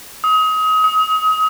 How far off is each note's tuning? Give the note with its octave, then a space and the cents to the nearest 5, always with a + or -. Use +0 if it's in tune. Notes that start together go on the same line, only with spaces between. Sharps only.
D#6 +30
D#6 +40